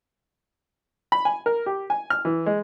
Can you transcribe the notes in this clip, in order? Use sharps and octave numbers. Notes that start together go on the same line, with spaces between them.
B5
G#5
A#4
G4
G#5
F6
E3
G#3